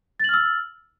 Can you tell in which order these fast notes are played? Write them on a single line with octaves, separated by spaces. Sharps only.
A6 F#7 F6 E6